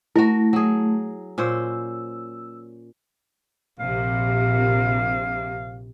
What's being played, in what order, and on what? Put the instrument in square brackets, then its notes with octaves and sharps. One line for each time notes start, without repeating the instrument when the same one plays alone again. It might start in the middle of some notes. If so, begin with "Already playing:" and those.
[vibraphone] A3 [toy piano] E4 [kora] F#4 A#4
[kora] F#3 G#4
[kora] A#2 C#4 C5 [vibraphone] E6
[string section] A#1 C3 [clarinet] F5